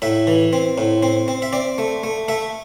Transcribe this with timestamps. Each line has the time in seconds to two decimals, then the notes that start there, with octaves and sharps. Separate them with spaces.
0.02 A2 E5
0.27 E3
0.53 C4
0.78 A2
1.03 C4
1.28 C4
1.42 E5
1.53 C4 D5
1.78 A3
2.03 A3
2.28 A3 E5